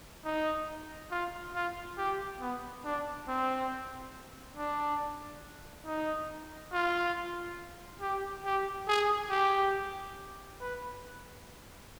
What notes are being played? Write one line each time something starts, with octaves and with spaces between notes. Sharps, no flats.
D#4
F4
F4
G4
B3
D4
C4
D4
D#4
F4
G4
G4
G#4
G4
B4